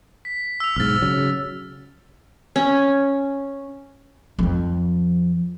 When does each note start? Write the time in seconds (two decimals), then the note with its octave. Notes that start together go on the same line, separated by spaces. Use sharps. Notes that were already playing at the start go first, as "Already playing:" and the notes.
0.25 B6
0.60 E6 F7
0.76 B1 G#2 E6 F6 A6
1.02 C#3 F#3
2.56 C#4
4.39 F2 F3